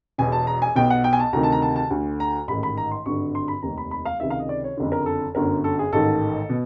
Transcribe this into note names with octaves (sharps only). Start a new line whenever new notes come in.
E1 E2 B2 G#5
A5
A#5
G#5
B1 B2 G5
F#5
G5
G#5
A5
D2 C3 D#3 A#5
A5
A#5
A5
A5
D2 D3
A#5
A1 G#2 D#3 B5
B5
A#5
C6
G#1 G2 D3 C#6
C6
B5
F1 D#2 D#3 A#5
B5
B5
F5
C#2 C3 D#3 E5
F5
D#5
D5
C#5
F#1 F2 D3
A#4
A4
G1 F#2 D3 A#4
A4
G#4
A1 G#2 D#3 A4
B2